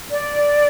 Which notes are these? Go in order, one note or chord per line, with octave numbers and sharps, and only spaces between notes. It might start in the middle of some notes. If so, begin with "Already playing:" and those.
D5